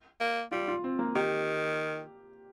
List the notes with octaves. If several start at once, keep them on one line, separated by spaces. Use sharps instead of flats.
A#3
G3 F4
F4
C4
A#3
D#3 G4